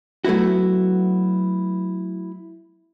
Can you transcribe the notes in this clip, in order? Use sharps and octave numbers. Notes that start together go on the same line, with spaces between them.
F#3 A3 B3 E4 F#4